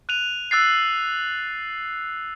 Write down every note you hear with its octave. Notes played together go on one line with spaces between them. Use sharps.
F#6 D#7 F7
E6 F#6 A6 C7